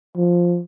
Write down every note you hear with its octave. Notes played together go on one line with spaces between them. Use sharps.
F3